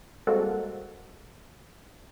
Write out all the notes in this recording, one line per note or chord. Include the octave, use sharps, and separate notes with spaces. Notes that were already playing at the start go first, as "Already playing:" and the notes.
G3 G#3 A#3 C4 F#4 A4